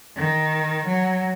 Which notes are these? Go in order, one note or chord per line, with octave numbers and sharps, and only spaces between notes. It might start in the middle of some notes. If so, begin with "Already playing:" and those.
D#3
F#3